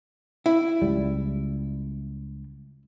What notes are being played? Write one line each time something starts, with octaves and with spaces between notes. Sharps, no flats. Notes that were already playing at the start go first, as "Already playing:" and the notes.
E4
C#2 G3